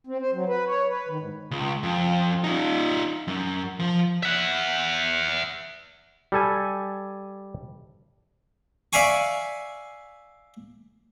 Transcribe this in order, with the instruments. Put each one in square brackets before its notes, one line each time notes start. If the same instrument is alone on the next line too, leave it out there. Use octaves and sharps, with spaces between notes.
[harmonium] C4
C5
F#3
B4
C#5
B4
D#3
G#2
[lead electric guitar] C#2
F2
D#4 F4
F#2
F3
[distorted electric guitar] E5 F#5
[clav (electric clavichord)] G3 A4 G#5
[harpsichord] D5 E5 F5 G#5 C#6